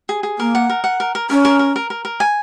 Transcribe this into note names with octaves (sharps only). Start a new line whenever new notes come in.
G#4
G#4
A#3 A#4
F#5
A#4
F#5
A#4
A#4
C#4 A#4
A#4
A#4
A#4
A#4
A#4
G#5